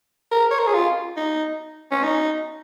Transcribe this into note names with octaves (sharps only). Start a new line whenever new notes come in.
A#4
C#5
A#4
G#4
F4
D#4
C#4
D#4